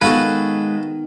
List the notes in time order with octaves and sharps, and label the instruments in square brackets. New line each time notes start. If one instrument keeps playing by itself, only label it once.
[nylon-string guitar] D#3 B3 [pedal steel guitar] G#3 B4 [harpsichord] F#4 A4 F5